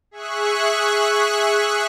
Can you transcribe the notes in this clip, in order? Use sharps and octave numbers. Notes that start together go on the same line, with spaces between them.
G#4 E5 C#6 F#6